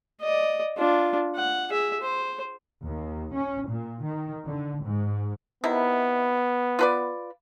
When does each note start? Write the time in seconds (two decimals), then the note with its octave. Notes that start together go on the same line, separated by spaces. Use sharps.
0.21 D5 D#5
0.78 D4 F4
1.36 F#5
1.70 G#4 E5
2.02 C5
2.83 D#2
3.35 C#4
3.68 A#2
4.02 D#3
4.46 D3
4.83 G#2
5.64 C3 D#3 B3 E4
6.79 F4 B4 D5